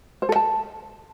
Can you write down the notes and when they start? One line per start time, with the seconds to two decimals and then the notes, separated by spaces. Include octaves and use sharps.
0.22 C5
0.29 A4
0.36 A5